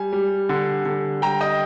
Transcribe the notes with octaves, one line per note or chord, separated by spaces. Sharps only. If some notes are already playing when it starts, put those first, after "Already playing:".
Already playing: G3 G#5
G3
D3
D3
G3 G5 A#5
D#5 G5